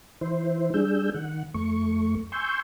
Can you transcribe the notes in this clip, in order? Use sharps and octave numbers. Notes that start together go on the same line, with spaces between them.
E3 E4 C5
G3 D4 G#4 E6 G6
D#3 F#5
F2 A3 C#6
G#5 C6 C#6 E6 G6